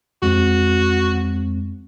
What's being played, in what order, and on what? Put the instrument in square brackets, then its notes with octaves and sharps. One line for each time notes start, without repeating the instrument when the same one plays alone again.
[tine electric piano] F2 G#3 C4 [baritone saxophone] F#4